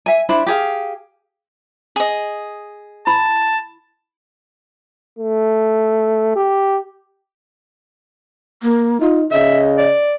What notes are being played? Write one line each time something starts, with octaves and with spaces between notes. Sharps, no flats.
E5 G#5
D4 E4 C5 B5
G4 G#4 F5
G#4 D#5
E4 A5 B5
A3
G4
A#3
D#4 F4
C#3 D#5 E5
D5